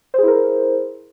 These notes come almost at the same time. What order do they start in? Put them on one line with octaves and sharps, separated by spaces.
C5 G#4 E4 A#4